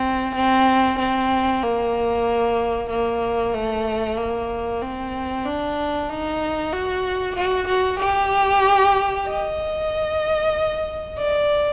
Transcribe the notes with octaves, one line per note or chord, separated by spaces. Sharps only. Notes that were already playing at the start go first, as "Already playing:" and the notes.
Already playing: C4
C4
C4
A#3
A#3
A3
A#3
C4
D4
D#4
F#4
F#4
F#4
G4
D#5
D5